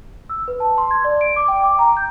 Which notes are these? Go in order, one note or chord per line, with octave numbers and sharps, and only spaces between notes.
E6
B4
A5
C6
G#6
D5
D7
D6
G5
D6
A#5
G6